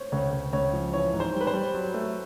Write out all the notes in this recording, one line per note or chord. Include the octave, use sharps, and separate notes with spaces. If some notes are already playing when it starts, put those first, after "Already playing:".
Already playing: C5 C#5
C#2 C#5
C#2
C#2 C#5
F3
E3 C#5
G#2
C5
G3
B4
C5
G3
F#3
A3